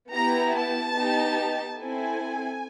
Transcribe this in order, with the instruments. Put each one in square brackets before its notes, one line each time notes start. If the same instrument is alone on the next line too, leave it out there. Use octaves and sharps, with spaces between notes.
[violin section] B3 E4 G4 A#5
A5
B3 D#4 G4
C4 E4 A4 G#5